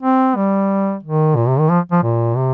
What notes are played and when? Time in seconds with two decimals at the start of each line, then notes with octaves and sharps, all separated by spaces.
0.03 C4
0.36 G3
1.03 D#3
1.36 A#2
1.47 C3
1.59 D#3
1.69 F3
1.91 F3
2.03 A#2
2.36 C3